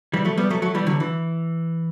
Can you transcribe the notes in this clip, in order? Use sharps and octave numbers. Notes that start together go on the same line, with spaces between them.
E3 G3
F#3 A3
G3 B3
F#3 A3
F#3 A3
E3 G3
D3 F#3
E3